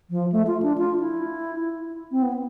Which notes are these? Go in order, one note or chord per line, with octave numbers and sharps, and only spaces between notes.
F3
A3
F4
D4
F4
E4
C4
B3